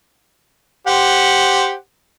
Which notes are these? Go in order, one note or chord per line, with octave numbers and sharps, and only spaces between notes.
G4 C5 F#5